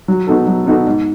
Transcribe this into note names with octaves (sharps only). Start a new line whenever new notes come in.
F#3
B3 D#4 F#4 A4
F#3
B3 D#4 F#4 A4
G#2